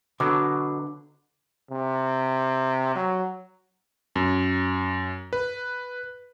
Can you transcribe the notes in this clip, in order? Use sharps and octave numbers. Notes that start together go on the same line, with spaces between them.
B2 D3 F#3 D6
C3
F#3
F#2
B4